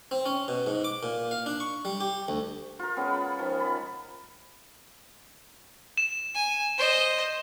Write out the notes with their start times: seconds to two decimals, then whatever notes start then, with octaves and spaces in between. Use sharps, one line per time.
0.11 C4
0.26 C#4
0.48 B2
0.66 G#2
0.84 D6
1.03 A#2
1.31 F5
1.46 D4
1.60 C#6
1.85 G3
2.01 G4
2.28 D2
2.79 F4 A#4
2.96 G#3 B3 C#4
3.10 B5
3.39 D#3 F3
3.61 B5
5.97 E7
6.35 G#5
6.78 C5 D#5